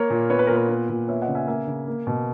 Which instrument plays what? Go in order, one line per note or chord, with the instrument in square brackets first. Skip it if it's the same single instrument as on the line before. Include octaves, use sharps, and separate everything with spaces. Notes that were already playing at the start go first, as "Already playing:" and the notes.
Already playing: [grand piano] A#3 A#4 C#5
A#2
B3 C#5
B4
A#2 A#4
B4
B3
A#2
B3 C#5 E5
D#5 F#5
C#3
E5 G#5
A#3 E5 G#5
C#3
A#3
B2